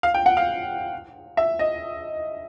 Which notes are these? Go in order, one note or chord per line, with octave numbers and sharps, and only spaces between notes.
F5
G5
F#5
F5
E5
D#5